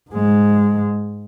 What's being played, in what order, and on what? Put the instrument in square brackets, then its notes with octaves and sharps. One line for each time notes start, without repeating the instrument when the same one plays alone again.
[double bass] G#2 G#3